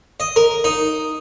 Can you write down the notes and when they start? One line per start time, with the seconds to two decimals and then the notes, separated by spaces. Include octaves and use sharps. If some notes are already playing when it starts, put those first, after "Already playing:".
0.20 D#5
0.36 A#4
0.64 D#4